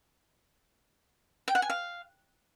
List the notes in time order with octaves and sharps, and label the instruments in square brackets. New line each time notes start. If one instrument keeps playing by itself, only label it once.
[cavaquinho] G5
F#5
G#5
F5